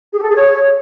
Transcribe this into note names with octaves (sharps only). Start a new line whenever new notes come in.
G#4
G4
A4
G#4
C#5